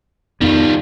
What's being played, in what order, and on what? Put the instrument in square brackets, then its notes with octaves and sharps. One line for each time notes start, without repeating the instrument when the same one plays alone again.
[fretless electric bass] F2 B3 [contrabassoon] D#3 [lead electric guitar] G3 F4